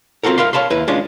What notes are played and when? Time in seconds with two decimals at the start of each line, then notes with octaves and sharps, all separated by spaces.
0.23 C4 F4 F#4 A4 A#4
0.38 C2 A#4 F5 B5 C6
0.53 C#5 F5 A5 B5 C6
0.70 D#2 E4 B4
0.88 G#3 C#4 D4 F4